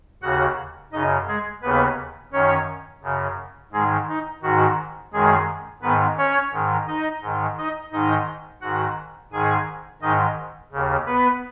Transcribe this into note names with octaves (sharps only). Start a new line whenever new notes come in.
D#2 C#3 F#4 F#5
F#2 C#3 D#4 D#5
G#3 G#4
D#2 C#3 B3 B4
F#2 D#3 C#4 C#5
F#2 C#3
G#2 D#3 G#3 G#4
D#4
G#2 D#3 F#4
F#2 D#3 G#3 G#4
G#2 D#3 B3 B4
C#4 C#5
G#2 D#3
D#4 D#5
G#2 D#3
D#4 D#5
G#2 D#3 D#4 D#5
G#2 D#3 F#4 F#5
G#2 D#3 G#4 G#5
G#2 D#3 D#4 D#5
D#2 C#3
B3 B4